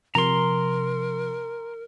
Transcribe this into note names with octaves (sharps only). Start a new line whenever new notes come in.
C3 F3 A#4 A#5 C6